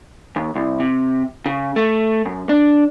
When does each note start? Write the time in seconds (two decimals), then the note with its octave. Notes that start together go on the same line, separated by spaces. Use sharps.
0.36 D#2
0.55 C2
0.80 C3
1.46 C#3
1.76 A3
2.25 F#2
2.49 D4